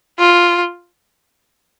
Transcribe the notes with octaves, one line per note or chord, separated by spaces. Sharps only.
F4